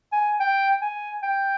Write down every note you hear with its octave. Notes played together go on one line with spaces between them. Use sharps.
G#5
G5
G#5
G5